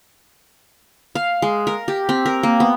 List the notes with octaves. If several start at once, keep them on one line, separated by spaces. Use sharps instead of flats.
F5
G#3
A#4
G4
C4
A#4
A#3
B3